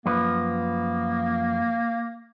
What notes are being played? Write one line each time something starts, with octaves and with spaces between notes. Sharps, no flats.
F#2 F3 A#3 B4